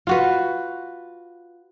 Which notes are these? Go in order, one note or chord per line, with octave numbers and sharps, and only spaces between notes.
F4 F#4 B4